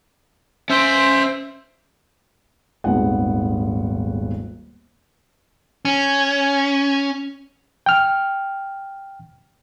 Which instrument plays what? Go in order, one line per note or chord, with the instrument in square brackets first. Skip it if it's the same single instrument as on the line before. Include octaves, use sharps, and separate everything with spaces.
[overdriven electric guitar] C#4 C6 [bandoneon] C5 E5
[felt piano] D#1 G#1 G#2 B3 F#5
[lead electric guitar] C#4
[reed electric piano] G5 F6